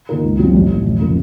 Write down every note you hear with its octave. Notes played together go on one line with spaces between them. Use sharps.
D#3 A#3 F4 A#4
C#2
C#3 F#3 C4 F4
A1
A2 A3
F1
C#3 F3 A#3